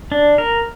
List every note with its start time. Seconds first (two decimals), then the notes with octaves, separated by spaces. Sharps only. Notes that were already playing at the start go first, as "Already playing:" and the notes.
0.12 D4
0.38 A#4